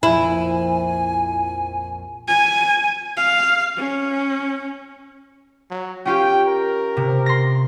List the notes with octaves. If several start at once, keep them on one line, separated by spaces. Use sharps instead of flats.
A#1 F2 E4 G#5 D#7
G#5
F5
C#4
F#3
C#4 F4 G4 G5
A#4
C3
C6 A#6